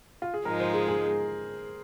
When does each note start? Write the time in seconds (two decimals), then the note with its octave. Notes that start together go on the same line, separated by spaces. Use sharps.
0.22 F4
0.34 G#4
0.45 G#2 F3 G#3 D#4 A#4
0.60 C5
0.74 G#4
0.88 G#4